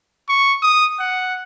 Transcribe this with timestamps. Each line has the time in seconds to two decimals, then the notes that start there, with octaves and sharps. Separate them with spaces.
0.29 C#6
0.62 D#6
1.00 F#5